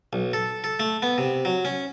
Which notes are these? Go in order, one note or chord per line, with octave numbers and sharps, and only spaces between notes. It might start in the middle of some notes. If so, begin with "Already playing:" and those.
B1
A4
A4
A3
B3
C3
F#3
C#4